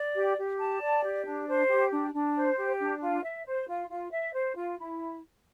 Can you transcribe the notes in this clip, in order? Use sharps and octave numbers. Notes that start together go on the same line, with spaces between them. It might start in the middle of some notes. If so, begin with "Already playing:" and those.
Already playing: D5
G4
G4
A5
D5
G4
D4
C5
G4
D4
D4
C5
G4
D4
F4
E5
C5
F4
F4
E5
C5
F4
E4